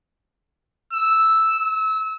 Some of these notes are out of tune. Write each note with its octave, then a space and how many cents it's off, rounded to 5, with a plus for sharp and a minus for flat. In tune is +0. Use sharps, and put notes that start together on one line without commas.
E6 -5
E6 -25